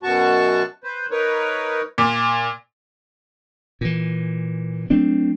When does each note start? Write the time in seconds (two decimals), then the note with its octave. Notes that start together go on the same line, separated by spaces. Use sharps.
0.03 F#2 B2 F#4 A5 C#6
0.84 B4 C5
1.11 D#4 A#4 B4 C#5
1.98 A#2
3.81 A#2 E3
4.90 F#3 A3 C4 D4